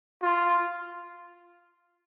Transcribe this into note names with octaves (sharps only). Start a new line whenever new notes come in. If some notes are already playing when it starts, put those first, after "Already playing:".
F4